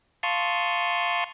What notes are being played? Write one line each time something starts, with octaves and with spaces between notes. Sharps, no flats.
F5 A5 C6 C#6 D#6 F6